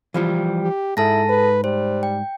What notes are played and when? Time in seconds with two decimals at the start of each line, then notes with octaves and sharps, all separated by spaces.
0.14 E3 F3 G3
0.62 G4
0.97 G#2 E4 A4 A5 A#6
1.29 B4
1.64 G3 C5
2.03 G5